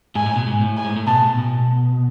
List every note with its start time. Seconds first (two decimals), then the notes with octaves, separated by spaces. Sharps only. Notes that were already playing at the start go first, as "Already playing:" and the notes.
0.15 G#2 G#5
0.26 A2
0.36 B2
0.46 G#2
0.61 A2
0.77 G#5
0.84 G#2
0.96 A2
1.07 B2 A5
1.22 A2
1.37 B2